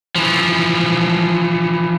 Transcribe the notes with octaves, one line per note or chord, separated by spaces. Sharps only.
E3 F3